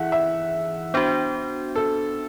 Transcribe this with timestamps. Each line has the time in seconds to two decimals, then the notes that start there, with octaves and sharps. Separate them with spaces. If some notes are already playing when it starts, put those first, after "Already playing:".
Already playing: E3 E4 G#4 E5 F#5
0.12 E5
0.94 B3 D4 F#4 C5
1.76 A4